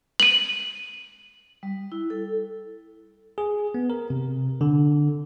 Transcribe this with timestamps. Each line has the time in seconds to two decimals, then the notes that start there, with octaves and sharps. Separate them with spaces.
0.20 D#7 F#7
1.63 G3
1.92 E4
2.10 A4
3.38 G#4
3.74 B3
3.90 A#4
4.10 C3
4.61 D3